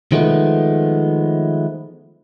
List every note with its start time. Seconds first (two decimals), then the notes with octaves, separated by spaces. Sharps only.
0.12 D#3 F3 G#3 A3 B3